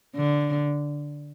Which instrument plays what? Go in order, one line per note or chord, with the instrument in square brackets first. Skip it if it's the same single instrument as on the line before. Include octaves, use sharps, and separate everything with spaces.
[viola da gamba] D3